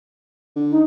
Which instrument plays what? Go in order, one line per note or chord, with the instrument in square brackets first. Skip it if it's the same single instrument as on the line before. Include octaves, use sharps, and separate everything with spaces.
[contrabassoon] D3
[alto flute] D#4